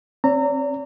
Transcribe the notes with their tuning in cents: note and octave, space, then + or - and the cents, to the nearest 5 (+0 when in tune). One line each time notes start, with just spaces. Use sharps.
C4 +25 D5 -40 A#5 -30